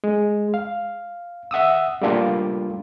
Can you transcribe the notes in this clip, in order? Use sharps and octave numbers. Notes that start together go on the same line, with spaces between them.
G#3
F5
E5 F#5 D#6 E6
G3 A3 A#3 D4 F4